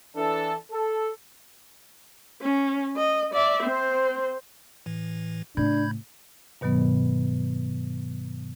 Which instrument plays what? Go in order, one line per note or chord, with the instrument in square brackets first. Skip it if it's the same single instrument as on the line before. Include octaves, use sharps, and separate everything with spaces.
[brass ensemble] E3 D4 A4
A4
[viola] C#4
D#5
D5 E5
C4 C5
[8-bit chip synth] A2 E3
[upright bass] A2 C#3 [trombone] D4 [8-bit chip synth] B5 G6 G#6
[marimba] G2 B2 D#3 F#3 B3